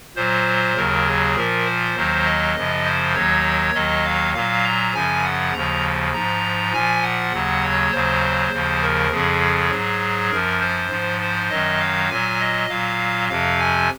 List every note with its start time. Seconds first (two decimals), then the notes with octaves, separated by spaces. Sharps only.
0.16 A#2 F#3 C5
0.76 D#2 C#3 F#3 A#4
1.06 G#4
1.36 A#2 F3 A#4
1.66 C5
1.95 D#2 D#3 F#3
2.26 D#5
2.55 F#2 C#3 F3
2.85 C5
3.15 D#2 D#3 F#3 C#5
3.74 D#2 D#3 F#3 D#5
4.05 F5
4.34 A#2 F#3 F5
4.64 A#5
4.94 F#2 C#3 F3 G#5
5.24 F#5
5.54 D#2 C#3 F3 A#5
6.13 G#2 F3 A#5
6.73 A#2 F3 G#5
7.03 F#5
7.32 D#2 C#3 F#3
7.63 C#5
7.92 D#2 C#3 F#3 C5
8.52 D#2 C#3 F3
8.82 A#4
9.11 F2 C#3 F3 G#4
9.71 G#2 F#3
10.31 F#2 F3 A#4
10.61 C5
10.90 G#2 F3
11.21 C5
11.50 F#2 D#3 F#3 D#5
11.80 F5
12.09 A#2 F#3 G#5
12.40 D#5
12.69 A#2 F#3 F5
13.29 F2 C3 F3 F5
13.59 G#5